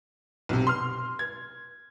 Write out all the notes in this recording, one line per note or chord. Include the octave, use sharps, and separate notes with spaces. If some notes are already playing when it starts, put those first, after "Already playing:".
B1 C3
C6 F6
G#6